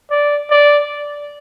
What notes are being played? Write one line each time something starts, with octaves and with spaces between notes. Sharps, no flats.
D5
D5